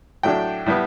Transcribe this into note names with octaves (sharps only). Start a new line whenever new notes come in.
A2 F#3 A3 D4 G5
A2 G3 B3